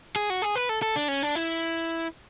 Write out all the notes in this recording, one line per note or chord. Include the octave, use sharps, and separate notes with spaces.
G#4
F#4
G#4
B4
A4
A4
D4
C#4
D4
E4